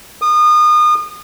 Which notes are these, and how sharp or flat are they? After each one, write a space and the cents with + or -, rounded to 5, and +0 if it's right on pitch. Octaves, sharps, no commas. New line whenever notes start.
D#6 -30